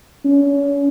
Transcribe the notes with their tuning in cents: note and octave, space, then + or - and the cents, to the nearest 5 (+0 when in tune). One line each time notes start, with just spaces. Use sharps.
C#4 +35